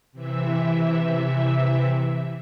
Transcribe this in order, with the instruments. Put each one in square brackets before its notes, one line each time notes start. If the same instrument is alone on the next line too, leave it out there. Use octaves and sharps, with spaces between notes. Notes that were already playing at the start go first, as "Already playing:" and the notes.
[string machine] C3 E3 E5